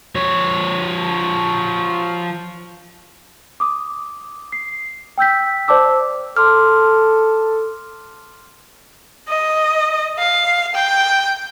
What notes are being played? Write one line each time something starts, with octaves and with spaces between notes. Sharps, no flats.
F3 C#5
D6 D#6
C7
G5 E6 G6 B6
C5 D5 A5 D6 E6
A4 C6 D6 F6
D#5
F5
G5